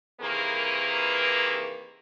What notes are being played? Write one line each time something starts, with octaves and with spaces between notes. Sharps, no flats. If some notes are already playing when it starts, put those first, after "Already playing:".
C3 D#3 E3 A#3 G#4 B4